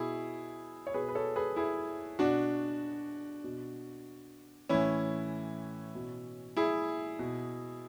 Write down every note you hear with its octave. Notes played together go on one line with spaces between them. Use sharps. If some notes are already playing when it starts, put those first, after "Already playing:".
Already playing: B2 E4 G#4
C#5
B2 G#4 B4
B4
A4 C#5
G#4 B4
E4 G#4
B2 D4 F#4
B2
A2 E3 C#4 E4
B2
E4 G#4
B2